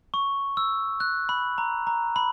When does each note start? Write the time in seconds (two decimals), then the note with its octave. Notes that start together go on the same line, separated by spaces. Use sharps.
0.14 C#6
0.57 E6
1.00 F#6
1.29 B5
1.58 A#5
1.87 A#5
2.16 B5